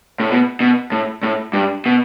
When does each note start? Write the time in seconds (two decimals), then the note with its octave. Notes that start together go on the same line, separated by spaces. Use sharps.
0.20 A2
0.30 B2
0.60 B2
0.92 A2
1.23 A2
1.53 G2
1.86 B2